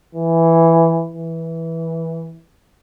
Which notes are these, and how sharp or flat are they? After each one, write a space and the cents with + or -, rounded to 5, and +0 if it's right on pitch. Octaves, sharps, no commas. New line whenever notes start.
E3 +5
E3 -10